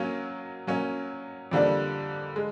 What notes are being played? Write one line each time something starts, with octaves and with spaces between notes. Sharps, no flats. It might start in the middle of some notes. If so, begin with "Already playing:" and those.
Already playing: F#3 A#3 C#4
F#3 A#3 C#4
F2 D3 G3 A#3 D4
G#3